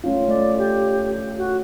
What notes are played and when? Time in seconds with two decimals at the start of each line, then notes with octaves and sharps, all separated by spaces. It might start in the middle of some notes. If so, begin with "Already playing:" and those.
0.04 A3 C#4 F4
0.28 A3 D5
0.58 G4
1.37 F#4